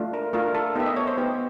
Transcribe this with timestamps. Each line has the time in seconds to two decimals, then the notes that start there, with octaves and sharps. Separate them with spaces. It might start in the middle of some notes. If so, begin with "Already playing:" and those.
Already playing: A3 D4 F4
0.14 A#4
0.33 A3 D4 F4 A#4
0.55 A4
0.75 B3 D#4 G4 E5
0.86 D#5
0.96 C#5
1.07 C5
1.17 B3 D#4 G4 C5